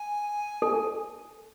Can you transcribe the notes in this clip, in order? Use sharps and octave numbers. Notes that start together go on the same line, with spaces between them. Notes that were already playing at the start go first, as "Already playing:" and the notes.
Already playing: G#5
A4